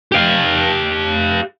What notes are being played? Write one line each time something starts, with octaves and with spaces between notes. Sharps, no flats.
G4 F5